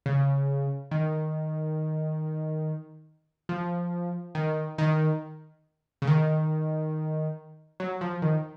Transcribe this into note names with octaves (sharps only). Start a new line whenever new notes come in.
C#3
D#3
F3
D#3
D#3
C#3
D#3
F#3
F3
D#3